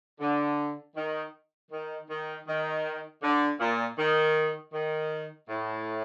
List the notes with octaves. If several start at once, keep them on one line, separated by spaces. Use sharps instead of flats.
D3
D#3
D#3
D#3
D#3
D3
A#2
D#3
D#3
A2